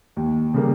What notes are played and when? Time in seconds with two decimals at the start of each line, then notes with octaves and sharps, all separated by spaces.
0.17 D#2
0.54 C#3 G3 A#3